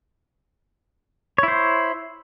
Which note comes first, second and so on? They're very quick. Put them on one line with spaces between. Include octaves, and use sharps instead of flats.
C#5 E4 C5